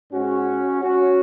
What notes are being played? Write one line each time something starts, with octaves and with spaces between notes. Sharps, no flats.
G#2 G#3 C#4 F#4
C#4 F#4